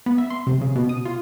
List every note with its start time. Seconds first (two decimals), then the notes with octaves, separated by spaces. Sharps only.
0.06 B3
0.18 E5
0.30 C6
0.47 C3
0.61 C#3
0.76 B2
0.89 D#6
1.05 F4